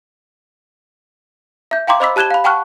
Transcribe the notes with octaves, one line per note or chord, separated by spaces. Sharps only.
E5 G6
F5 G5 A#5 C6 D6
C5 D#5 B5 D6 E6 B6
G4 A5 F#6 G#6 E7 G7
F5 B5
F#5 G5 A5 C#6 F6 F#6